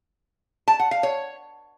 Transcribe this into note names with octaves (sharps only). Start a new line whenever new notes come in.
A5
F#5
F5
C#5